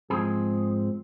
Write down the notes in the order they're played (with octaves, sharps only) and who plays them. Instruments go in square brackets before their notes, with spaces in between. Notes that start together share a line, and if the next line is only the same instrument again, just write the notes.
[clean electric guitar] G#2 F3 G#3 C4 G#4